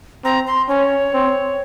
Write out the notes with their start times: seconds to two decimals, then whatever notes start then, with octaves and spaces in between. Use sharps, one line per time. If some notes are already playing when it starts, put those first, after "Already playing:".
0.25 C4 A#5
0.47 C6
0.69 C#4 C#5
1.14 C4